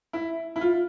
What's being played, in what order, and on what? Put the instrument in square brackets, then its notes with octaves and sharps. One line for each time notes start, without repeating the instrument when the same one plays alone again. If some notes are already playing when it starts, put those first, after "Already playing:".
[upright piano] E4
E4
F4